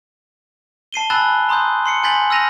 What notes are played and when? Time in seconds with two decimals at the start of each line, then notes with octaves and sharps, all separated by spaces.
0.93 A5 C7 D#7 G7
1.10 G#5 A5 B5 E6 F#6 A6
1.49 A#5 C6 D#6 F#6 G6
1.86 C6 C7 C#7
2.03 G#5 C6 G6 A6 B6 F#7
2.30 E6 F6 G6 A#6 D#7 F7